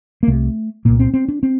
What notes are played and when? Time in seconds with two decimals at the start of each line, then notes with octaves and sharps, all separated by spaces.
0.23 A#3
0.27 C2 C3 A3
0.85 C2 A#2 A#3
1.00 C4
1.14 C4
1.28 D4
1.43 C4